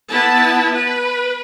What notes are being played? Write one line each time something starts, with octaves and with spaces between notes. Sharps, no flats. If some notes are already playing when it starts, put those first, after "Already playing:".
B3 E4 A5
B4